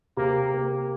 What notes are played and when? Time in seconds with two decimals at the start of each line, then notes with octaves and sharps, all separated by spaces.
0.17 C3 A#3
0.54 A#3